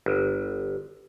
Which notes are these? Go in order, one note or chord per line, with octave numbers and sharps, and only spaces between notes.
G1